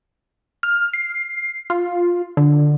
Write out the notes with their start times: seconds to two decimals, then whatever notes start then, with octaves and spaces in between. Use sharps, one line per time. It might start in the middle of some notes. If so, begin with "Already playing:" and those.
0.63 F6
0.93 C7
1.70 F4
2.37 D3